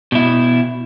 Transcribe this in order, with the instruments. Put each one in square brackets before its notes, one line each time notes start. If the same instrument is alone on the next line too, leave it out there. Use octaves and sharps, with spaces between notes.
[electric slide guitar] B2 E4